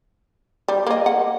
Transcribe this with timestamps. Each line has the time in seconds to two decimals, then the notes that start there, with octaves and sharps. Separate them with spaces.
0.68 G3
0.87 A#3 D#5
1.06 F#5